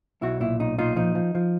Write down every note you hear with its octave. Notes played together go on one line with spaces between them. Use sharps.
B1 E4 F#4
A#2 E4
B1 D#4
A#2 D#4 F4
F3 D#4
F3
F3